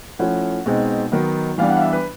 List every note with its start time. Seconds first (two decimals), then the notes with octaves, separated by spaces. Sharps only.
0.19 F3 A3 C#4 E4 F#5
0.66 B2 G#3 C4 D#4
1.12 D#3 F#3 B3 D#4
1.58 E3 G3 B3 D4 F5
1.70 F#5
1.76 F5
1.81 E5
1.93 B4